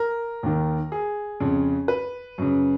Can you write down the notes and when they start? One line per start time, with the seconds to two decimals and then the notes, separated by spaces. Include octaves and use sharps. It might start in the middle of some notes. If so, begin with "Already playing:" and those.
Already playing: A#4
0.43 D#2 D#3
0.92 G#4
1.40 F2 C#3
1.88 B4
2.38 F#2 C#3